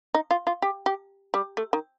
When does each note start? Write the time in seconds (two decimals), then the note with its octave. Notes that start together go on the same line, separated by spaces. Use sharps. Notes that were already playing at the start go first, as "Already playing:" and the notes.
0.14 D#4
0.31 F4
0.47 F4
0.62 G4
0.86 G4
1.34 G3
1.57 A3
1.73 D#3